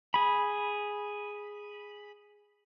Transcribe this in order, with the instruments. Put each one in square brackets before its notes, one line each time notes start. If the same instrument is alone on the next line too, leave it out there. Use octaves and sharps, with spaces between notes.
[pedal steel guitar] G#4 B5